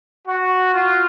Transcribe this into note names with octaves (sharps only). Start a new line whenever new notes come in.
F#4
F4